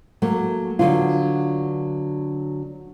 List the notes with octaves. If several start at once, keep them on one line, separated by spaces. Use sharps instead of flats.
F#3 A3 A#3
D3 F#3 B3 D4 F4